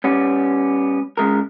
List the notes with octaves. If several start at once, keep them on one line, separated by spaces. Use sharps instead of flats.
G3 B3 C#4
C#3 G#3 A#4